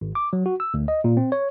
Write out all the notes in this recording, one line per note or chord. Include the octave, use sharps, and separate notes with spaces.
G#1
D6
F#3
F#4
E6
D2
D#5
A#2
C4
C#5